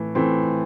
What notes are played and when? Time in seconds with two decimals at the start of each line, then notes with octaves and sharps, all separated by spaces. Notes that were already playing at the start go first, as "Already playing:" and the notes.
Already playing: A2 E3 A3
0.15 E3 A3 C4